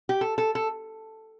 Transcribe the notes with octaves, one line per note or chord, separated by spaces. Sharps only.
G4
A4
A4
A4